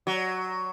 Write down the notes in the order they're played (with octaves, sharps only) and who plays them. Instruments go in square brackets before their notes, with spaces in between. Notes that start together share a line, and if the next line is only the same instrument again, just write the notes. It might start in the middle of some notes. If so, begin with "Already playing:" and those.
[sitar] F#3